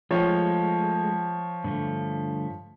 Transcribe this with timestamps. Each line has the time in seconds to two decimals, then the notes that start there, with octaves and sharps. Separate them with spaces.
0.11 F3 G#3 A3 C#5 G5
1.64 G2 D3 A3